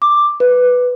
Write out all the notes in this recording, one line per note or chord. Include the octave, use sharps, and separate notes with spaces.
D6
B4